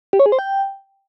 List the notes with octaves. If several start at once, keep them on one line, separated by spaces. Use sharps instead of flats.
G4
C#5
G#4
C5
G5